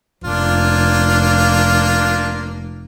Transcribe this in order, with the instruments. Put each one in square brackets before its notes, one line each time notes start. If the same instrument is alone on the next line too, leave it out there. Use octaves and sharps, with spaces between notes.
[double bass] F1 [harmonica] A#3 D4 F4